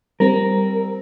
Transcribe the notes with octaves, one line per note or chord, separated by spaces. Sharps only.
G3 C4 A#4